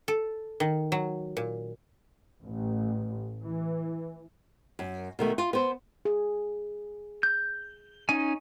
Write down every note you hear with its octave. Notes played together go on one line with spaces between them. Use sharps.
A4
D#3
F#3
A#2
A1
E3
F#2
B2 D#3 A3
F4
B3 C5
G#4
G6
C#4 D#4 G#5